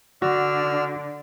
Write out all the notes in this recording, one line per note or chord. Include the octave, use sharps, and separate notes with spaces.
D3 D4 F#4 D5 E6 F6